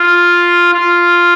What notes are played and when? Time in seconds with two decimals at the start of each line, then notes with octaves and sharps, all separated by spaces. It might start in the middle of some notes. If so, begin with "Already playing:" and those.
Already playing: F4
0.73 F4